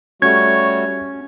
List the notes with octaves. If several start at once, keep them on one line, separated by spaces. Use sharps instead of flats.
G3 A3 C#4 F#4 C#5 G#6